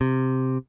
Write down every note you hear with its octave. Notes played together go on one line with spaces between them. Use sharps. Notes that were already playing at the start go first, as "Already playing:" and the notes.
C3